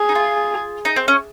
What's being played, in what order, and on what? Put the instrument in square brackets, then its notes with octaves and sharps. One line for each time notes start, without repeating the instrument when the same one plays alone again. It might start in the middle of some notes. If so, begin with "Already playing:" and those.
Already playing: [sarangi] G#4
[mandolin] D#4
F4
D#4
C4
C#4